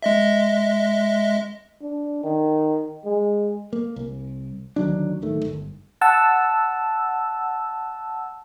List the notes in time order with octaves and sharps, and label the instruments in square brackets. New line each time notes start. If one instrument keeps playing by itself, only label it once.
[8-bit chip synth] G#3 D#5 E5
[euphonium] D4
D#3
G#3
[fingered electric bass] A#3
C2
D2 D#3 F#3 D4
D1 D#3 A3
G1
[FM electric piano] F#5 A5 E6